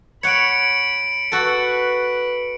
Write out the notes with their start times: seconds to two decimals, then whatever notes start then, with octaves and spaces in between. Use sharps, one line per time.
0.23 C#5 F#5 B5 C#7 D7
1.32 F#4 A4 B4